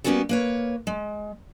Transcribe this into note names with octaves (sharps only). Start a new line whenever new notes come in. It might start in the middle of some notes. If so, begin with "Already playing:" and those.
G3 A#3 B3 C#4 F#4 A4
A#3 B4 C#5
G#3